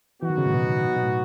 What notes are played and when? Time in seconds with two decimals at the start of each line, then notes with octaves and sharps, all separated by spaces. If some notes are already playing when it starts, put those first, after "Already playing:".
0.22 E3 F#3 B3 D#4 F#4
0.30 D#3
0.38 C#3
0.46 A2
0.54 B2
0.96 B2
1.03 A2